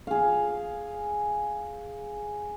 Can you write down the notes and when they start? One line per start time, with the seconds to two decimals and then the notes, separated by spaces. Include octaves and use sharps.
0.07 G#4 F5